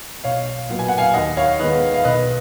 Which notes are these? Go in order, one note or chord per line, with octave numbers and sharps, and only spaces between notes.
B1 C#5 F5
A#2 F#3 B3
G#5
F#5
F5 G#5
D#2 D#5 F#5
C#5 F5
D#3 G#3 B3 B4 D#5
F5
B1 B4 D#5